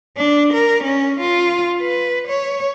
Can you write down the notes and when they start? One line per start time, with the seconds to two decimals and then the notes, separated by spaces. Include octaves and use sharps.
0.17 D4
0.53 A#4
0.84 C#4
1.20 F4
1.82 B4
2.28 C#5